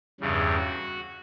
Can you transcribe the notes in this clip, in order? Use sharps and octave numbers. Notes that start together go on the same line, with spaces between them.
E2 G2 C#3
F#4